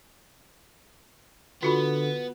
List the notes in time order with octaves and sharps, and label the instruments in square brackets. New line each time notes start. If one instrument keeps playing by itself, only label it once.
[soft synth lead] D3 [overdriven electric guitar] B3 [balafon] F4 F#4 B5